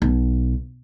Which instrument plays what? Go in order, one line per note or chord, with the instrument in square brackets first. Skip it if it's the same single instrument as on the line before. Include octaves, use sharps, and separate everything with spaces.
[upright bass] B1